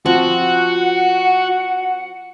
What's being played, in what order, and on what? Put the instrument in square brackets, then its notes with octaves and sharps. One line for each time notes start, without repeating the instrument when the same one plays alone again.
[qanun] F3 C4 [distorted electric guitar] F#4 [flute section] F#5